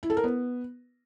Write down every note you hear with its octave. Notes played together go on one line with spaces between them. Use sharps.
E4
A4
A#4
B3